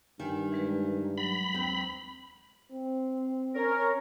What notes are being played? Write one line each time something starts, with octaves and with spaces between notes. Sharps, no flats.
G2 D#3 G#5
E3 G#3 B4
F#3 B5
D#2 C4
C4
C#4 A#4 C#5